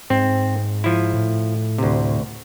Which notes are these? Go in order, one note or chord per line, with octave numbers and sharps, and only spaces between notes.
G#2 C4
F3 E4
A2
D2 C3